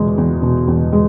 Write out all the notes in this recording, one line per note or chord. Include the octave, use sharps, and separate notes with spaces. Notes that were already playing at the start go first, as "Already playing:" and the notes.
Already playing: E2 B2 G#3
E2
B2
E2
G#3